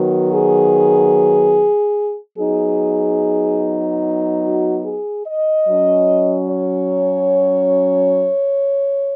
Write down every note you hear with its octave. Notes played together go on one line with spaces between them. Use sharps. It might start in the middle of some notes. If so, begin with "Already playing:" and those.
Already playing: D#3 F#3 B3 F#4
G#4
F#3 B3 D#4 G#4
F#4
G#4
D#5
F#3 C#4
C#5